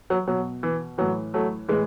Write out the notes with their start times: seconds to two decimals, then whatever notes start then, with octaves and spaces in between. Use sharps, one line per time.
0.10 F#3
0.27 B2 F#3
0.63 E3
0.98 A2 E3 F#3
1.34 F#3 A3
1.69 A2 E3 G#3